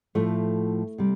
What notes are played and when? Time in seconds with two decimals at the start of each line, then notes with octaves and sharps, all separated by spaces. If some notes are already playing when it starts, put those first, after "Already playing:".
0.15 A2 F3 A3
0.98 C3 G3